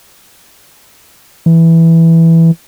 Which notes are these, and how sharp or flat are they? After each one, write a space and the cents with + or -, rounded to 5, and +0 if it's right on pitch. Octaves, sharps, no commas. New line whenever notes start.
E3 +0